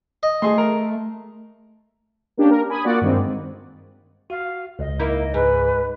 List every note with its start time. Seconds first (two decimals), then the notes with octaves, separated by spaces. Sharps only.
0.23 D#5
0.42 A3 G#4 C6
0.58 A#4
2.37 A#3 C#4 D4 G4
2.50 A#4
2.70 G#5 B5 D#6
2.84 A#3 F4 F#4 D5 F#5
3.01 G2 D#3 G#3 C4
4.30 F#4 F5
4.79 C#2 D#5
4.99 A#3 D#4 E4
5.34 G#2 B4